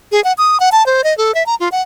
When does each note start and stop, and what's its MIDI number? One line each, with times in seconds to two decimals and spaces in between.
0.12 0.22 68
0.24 0.33 78
0.38 0.60 87
0.60 0.69 78
0.72 0.86 81
0.86 1.04 72
1.04 1.16 75
1.17 1.34 69
1.34 1.45 76
1.46 1.55 82
1.60 1.68 65
1.72 1.82 78